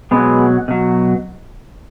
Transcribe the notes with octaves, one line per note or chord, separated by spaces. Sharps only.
B2 F#3 G#3 B3
B2 F#3